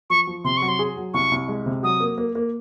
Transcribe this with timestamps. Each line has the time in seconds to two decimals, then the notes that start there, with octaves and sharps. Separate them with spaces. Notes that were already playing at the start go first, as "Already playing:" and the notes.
0.10 F3 C#6
0.27 F3
0.44 C3 C6
0.57 F#3 C#6
0.68 C6
0.79 G#4
0.97 F#3
1.14 C2 C#6
1.31 C2
1.48 G#3
1.66 C3
1.83 F#3 D#6
2.00 A#3
2.18 A#3
2.35 A#3